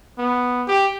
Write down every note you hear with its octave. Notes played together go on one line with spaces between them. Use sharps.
B3
G4